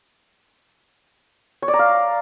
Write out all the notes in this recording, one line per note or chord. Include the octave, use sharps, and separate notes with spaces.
C#5
D5
A#5
F5